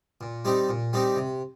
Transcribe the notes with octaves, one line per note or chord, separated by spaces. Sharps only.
A#2
G3 C4 D#4 G4
A#2
G3 C4 D#4 G4
C3